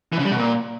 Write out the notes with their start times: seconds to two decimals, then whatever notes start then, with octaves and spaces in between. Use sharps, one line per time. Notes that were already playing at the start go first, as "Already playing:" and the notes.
0.13 E3
0.19 C#3
0.25 G3
0.31 B2
0.38 A#2